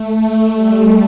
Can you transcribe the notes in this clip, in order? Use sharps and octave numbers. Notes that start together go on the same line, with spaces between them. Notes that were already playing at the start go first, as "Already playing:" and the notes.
Already playing: A3
G3